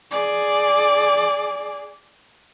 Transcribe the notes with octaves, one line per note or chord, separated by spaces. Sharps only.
G#4 D5